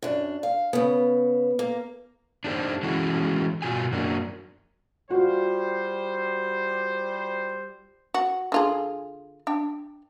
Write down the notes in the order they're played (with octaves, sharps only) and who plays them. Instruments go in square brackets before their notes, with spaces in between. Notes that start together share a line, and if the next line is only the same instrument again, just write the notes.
[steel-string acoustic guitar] F#2 D4
F5
C#3 B3
A#3
[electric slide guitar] D4 D#4 G4 A4 B4 C5
E3 G#3 C#4 E4 F#4 A4
G2 B2 F4 F#4 G#5
F#2 F#3 A#3 D4
[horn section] G3 C5 [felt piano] F4 F#4
[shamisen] F#4
D3 F4 G#4
D4 G5